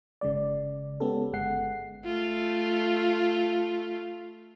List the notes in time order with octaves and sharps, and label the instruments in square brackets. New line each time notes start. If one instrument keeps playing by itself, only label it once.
[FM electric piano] G1 C#3 G#3 D5
G#3 B3 C#4 G4 A4
G1 G#3 F#5 C7
[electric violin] A3 F4